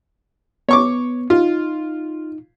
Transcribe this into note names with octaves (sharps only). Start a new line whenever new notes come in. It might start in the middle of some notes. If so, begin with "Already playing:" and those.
B3 C#5 C#6 D6
D#4 F4